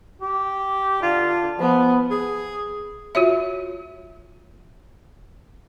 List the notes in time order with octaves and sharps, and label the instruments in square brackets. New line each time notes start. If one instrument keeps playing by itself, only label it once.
[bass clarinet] G4
[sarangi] D3 [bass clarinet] F4
[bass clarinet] F3 [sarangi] B3
[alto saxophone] G#4
[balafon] F4 F#4 C#5 E5